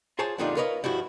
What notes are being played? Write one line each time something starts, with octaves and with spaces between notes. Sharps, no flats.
F4 G#4 C5 C#5 A5
F2 A#2 D3 G3 D#4 F4
A#4 B4 C#5 D#5 F5
G2 F3 E4 F#4